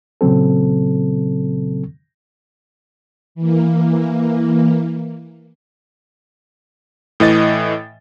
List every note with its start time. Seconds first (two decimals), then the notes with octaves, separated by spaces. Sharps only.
0.21 A#2 C#3 F#3 C4 A4
3.35 E3 A#3
7.20 A2 E3 D#5 A6